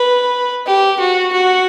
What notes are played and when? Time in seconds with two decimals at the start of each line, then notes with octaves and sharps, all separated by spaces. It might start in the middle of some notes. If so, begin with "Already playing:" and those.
Already playing: B4
0.66 G4
0.99 F#4
1.33 F#4